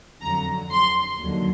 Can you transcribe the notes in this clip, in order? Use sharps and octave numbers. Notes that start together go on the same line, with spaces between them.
F2 D3 F#3 A#5
C6
D#2 D3 F#3